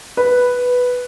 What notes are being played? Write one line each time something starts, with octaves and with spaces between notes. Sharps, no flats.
B4